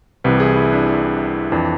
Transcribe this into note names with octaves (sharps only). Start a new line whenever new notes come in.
C2 C3 E3 B4
G#4
E4
D4
D4
F2 E3 D4